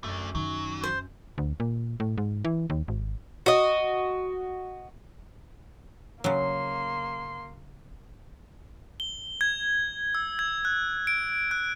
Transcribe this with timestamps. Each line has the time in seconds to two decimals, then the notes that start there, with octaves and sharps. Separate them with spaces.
0.04 F#2 A3 D4
0.35 D#3 F#3
0.84 C5
1.38 D2
1.60 A#2
2.00 A2
2.18 G#2
2.45 E3
2.70 D#2
2.88 G#1
3.46 F#4 D#5
6.24 C#3 F#3 A#3 C6
9.00 G7
9.41 G#6
10.15 E6
10.39 G#6
10.65 F#6
11.07 D7
11.51 F#6